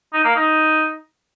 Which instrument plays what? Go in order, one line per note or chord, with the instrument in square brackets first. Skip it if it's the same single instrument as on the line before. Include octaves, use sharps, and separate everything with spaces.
[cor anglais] D#4
A#3
D#4